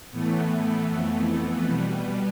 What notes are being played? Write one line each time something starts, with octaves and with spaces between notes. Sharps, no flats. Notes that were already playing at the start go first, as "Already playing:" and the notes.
A2 E3 A3 B3
F2 E3 A3 B3
B2 G3 B3